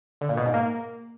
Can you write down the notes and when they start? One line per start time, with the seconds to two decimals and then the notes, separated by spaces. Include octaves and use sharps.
0.21 D3
0.29 A#2
0.37 B2
0.46 G#2
0.54 A#3